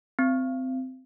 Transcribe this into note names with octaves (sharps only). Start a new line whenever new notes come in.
C4